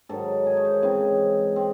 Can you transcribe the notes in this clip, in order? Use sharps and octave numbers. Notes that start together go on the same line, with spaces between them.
G#2 D#3 F#3 A4
G#4
C#5
C5
C#3 E3 G#3 C4
G#3 C4